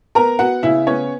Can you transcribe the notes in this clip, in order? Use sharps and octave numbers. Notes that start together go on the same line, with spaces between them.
B3 A#4 A#5
B3 F#4 F#5
C#3 E4 E5
B3 C#4 C#5